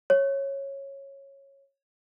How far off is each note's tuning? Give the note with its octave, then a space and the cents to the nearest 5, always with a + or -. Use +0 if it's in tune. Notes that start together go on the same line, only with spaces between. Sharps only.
C#5 -10